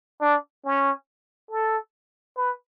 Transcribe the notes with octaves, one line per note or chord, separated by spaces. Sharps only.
D4
C#4
A4
B4